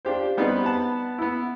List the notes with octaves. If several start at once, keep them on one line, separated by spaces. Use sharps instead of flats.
D4 F4 G4 C5
G3 B3 C4 D#4 G4 B4
B3 A5
B3 E4